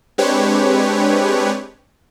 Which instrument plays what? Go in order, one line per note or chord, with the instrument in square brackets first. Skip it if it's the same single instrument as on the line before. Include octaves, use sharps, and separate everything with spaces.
[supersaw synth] G#3 C4 D4 G4 B4 C#5